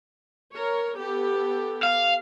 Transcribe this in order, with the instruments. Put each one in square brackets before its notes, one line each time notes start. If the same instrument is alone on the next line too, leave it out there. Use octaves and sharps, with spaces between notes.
[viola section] A#4 C#5
B3 G4 A4
[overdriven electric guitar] F5